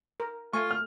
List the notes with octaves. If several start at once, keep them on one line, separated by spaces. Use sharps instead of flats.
A#4
A3 F4 G#5 C#6
F6